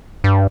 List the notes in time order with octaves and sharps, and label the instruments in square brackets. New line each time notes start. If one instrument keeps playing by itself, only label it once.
[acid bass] G2